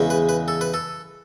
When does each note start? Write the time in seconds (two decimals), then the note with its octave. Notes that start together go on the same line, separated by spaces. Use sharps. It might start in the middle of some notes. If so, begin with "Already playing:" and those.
Already playing: E2 C#3 G#3
0.10 B4
0.29 B4
0.48 A4
0.61 B4
0.74 A4